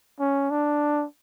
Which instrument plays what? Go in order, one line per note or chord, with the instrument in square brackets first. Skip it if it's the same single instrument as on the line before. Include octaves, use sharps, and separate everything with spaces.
[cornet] C#4
D4